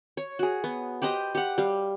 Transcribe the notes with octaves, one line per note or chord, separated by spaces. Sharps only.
C#5
F#4 G#4
B3
G4 B4 C5 D#5
G4 F#5
G3 F5